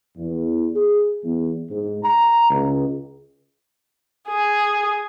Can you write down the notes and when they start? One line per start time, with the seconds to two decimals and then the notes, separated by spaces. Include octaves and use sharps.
0.17 E2
0.74 G#4
1.24 E2
1.69 G#2
2.04 A#5
2.51 C#2
4.29 G#4